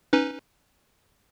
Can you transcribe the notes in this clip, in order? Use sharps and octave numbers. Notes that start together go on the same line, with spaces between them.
C#4 D#4 B4